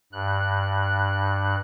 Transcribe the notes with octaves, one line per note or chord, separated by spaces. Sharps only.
G2 F#6